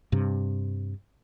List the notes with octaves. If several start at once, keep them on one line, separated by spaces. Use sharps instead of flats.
G2 C3